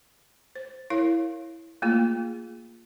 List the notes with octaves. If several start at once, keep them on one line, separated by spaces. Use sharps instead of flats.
C5
E4 A#4 C#5 F5
A3 A#3 F4 G#4